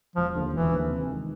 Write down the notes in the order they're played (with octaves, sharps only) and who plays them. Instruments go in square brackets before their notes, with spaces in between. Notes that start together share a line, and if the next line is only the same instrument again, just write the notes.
[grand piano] E1 [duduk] F3
[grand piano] D#2 D3 F3
[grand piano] E1 [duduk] E3
[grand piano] D#2 D3 F3
C3
D#3 G#3